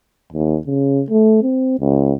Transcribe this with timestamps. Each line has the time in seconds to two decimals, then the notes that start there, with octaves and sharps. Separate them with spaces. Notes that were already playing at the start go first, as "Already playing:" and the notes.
0.33 D#2
0.66 C#3
1.10 A3
1.43 C4
1.80 C#2